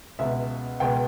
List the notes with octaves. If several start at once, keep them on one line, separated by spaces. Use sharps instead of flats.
C#2 B2 E5
C#2 B2 G5